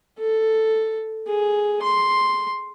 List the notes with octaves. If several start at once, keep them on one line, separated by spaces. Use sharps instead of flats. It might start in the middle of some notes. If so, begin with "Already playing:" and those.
A4
G#4
C6